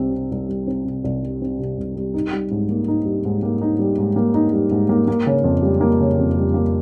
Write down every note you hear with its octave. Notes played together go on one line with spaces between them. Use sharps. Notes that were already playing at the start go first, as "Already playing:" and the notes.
Already playing: C2 C3 G3 C4
C3
C2
G3
C4
C3
C2
G3
C4
C3
C2
G3
D#4
G3
G#2
A#3
D#4
G3
G#2
A#3
D#4
G3
G#2
A#3
D#4
G3
G#2
A#3
A#3
C#3
F2
G3
A#3
C#3
F2
G3
A#3